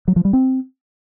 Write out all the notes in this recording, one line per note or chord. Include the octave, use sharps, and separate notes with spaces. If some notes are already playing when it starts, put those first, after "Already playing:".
F#3
F3
G3
C4